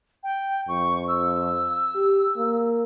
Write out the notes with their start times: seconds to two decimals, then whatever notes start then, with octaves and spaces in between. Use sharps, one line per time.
0.23 G5
0.68 F2 C#6
1.08 E6
1.96 G4
2.37 A#3